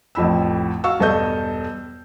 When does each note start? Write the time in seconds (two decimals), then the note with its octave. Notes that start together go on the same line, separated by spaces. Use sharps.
0.15 A1 F2 A2 B5 E6
0.84 F#4 F5 C#6 E6
0.99 E1 G2 A4 D#5 G6